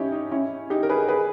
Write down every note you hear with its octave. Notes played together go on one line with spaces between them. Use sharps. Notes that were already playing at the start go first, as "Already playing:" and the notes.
Already playing: C#4 D#4 E4 G4
D#4
C#4 E4
D#4 G4
A#4
G#4 B4
G#4 B4